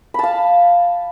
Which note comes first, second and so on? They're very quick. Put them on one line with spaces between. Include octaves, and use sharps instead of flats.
B5 A5 F5